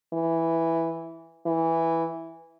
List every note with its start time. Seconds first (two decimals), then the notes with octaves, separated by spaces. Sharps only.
0.14 E3
1.46 E3